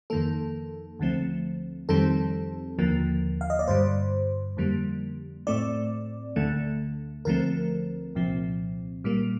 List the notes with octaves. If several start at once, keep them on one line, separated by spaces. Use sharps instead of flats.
F2 D#3 A#3 A4
D2 D3 F3 A3 C4
F2 D#3 G3 C4 A4
D#2 D3 F3 A#3
F5
D#5
D5
G2 D3 G3 C5
F2 D3 G3 A#3
A2 A3 C4 D5
D2 D3 A3
D2 D3 F3 A3 C4 A#4
C2 A#2 F3 C4
A#2 G3 A#3